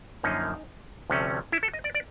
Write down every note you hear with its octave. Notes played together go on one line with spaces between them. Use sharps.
F#2 D3 F3 A#3 C#4 D#4
D2 C3 F3 A3 C#4
E4
A4
D#5
D5
D5